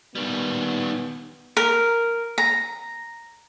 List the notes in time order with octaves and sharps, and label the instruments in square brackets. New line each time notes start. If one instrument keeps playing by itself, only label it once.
[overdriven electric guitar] D#3 G3 [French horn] B3
[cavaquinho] A#4
A#5